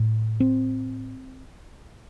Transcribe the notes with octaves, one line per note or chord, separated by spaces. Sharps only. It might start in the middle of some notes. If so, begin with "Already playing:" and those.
Already playing: A2
C4